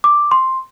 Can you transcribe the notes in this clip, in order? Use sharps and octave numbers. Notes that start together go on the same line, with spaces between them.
D6
C6